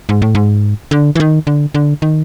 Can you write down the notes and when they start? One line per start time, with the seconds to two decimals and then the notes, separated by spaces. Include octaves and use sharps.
0.09 G#2
0.22 A2
0.35 G#2
0.91 D3
1.15 E3
1.20 D#3
1.47 D3
1.74 D3
2.02 D#3